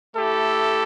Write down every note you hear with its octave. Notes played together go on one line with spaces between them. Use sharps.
A3 E4 G4 A4